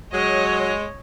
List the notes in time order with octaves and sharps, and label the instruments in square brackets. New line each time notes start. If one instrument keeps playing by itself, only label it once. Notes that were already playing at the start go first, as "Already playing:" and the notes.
[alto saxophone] F#3 [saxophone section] G#3 [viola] C#5 [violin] D#5